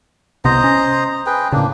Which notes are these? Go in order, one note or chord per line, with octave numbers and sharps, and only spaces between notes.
C2 C3 B3 C5 D#5 A#5
C#4
G#4 B4 G5
A2 C#3 A#3 D4